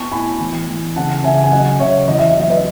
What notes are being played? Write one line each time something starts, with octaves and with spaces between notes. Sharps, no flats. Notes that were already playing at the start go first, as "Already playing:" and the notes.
Already playing: B3 A5 C#6
A2 G#5 B5
E3
E3
C#3 F#5 A5
C#3 E5 G#5
G#5
F#3 D#5 F#5
C#3 C#5 E5
E2 D#5
E5
D#5
F#3 E5
B4 D#5